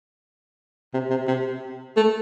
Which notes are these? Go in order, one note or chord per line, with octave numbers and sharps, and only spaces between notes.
C3
C3
C3
A3